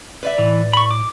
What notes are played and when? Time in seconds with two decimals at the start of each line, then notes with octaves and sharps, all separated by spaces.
0.23 B4 D5 E5
0.38 A2 E3
0.73 B5 C#6
0.91 D6